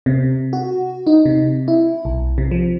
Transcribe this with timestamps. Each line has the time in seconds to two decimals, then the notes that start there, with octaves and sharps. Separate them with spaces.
0.06 C3
0.53 F#4
1.07 D#4
1.26 C3
1.68 E4
2.05 B1
2.38 C3
2.51 F3